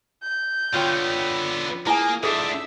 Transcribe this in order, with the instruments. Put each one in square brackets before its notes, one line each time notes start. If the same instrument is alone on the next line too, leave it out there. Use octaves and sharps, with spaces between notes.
[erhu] G6
[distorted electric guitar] D3 B3 [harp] F4 C#5 G5
[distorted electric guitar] A#3 [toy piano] E4 G#5 [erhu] G#4
[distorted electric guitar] G#2 D4 [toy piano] G#4 A4 [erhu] E5 [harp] D#6